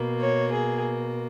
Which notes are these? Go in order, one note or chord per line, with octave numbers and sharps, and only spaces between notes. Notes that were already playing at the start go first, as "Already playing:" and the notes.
Already playing: B2 A#3
C#5
G#4